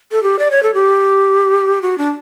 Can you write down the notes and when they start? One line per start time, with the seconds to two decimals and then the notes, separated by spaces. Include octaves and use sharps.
0.12 A4
0.23 G4
0.39 D5
0.51 C#5
0.63 A4
0.74 G4
1.82 F#4
1.98 D4